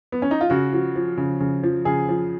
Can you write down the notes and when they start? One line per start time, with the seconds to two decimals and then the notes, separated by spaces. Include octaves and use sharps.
0.12 B3
0.22 C#4
0.31 D#4
0.41 F4
0.50 C#3 F#4
0.73 F3 F#4
0.96 F3
1.17 C#3
1.40 C#3
1.63 F3
1.85 C#3 G#4
2.09 F3